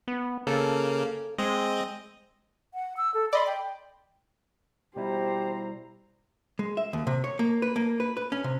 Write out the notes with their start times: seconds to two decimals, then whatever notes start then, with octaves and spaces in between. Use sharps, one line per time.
0.08 B3
0.47 C#3 A#3 A4
1.38 G#3 C4 D#5
2.74 F#5
2.97 E6
3.14 A4
3.33 D5 D#5 B5 C6
3.47 G5
4.96 B2 G3 E4 G4 C5 A#5
6.59 G#3
6.77 E5
6.93 D#2
7.07 C3
7.24 C#5
7.39 A#3
7.62 B4
7.76 A#3
8.00 B4
8.17 B4
8.32 C#4
8.44 C3